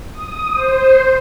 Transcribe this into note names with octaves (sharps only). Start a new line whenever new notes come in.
D#6
C5